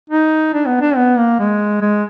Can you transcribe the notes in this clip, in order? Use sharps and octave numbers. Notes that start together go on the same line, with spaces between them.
D#4
D4
B3
D4
B3
A#3
G#3
G#3